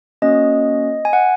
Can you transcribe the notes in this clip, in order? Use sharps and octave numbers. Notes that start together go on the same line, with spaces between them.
A#3 C#4 F#4 D#5
G#5
F#5